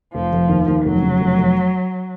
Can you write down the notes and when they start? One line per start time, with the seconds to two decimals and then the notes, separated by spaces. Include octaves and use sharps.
0.15 F1 F3
0.33 F1
0.49 D#2
0.68 D#2
0.85 F1 F#3
1.02 C#3
1.20 F1
1.38 F1